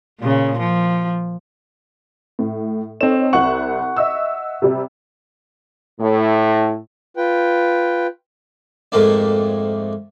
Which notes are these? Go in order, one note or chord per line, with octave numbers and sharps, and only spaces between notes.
A#2 C#3
F3
A2
C4 D#4 A4 C#5 E7
C2 C4 F#5 C#6 F#7
D#5 E5 E6
C3 G3
A2
F4 B4 G5
F2 G#2 A3 A#3 D4